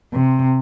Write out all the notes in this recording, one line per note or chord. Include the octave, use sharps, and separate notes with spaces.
C3